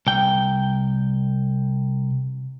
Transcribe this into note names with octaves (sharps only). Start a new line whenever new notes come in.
C2 G5